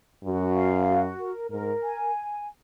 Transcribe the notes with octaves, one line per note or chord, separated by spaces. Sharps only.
F#2 F#4
F5
F#4
A#4
G#2 A#4
G#5